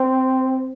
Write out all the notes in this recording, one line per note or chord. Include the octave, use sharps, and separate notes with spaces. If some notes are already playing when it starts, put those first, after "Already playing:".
Already playing: C4